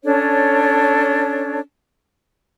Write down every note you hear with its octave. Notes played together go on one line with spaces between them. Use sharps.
C#4 D4 A4 C#5